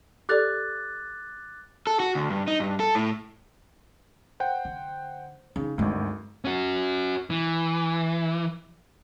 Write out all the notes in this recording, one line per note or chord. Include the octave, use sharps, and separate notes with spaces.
G4 A4 D5 D6 F#6 A6
A4
F#4
D2
G2
D#4
G2
A4
A2
C5 F#5 G5
D3
C#3 C4 D#4
G#1 D2 G2 G#3
C#4 F#4
E3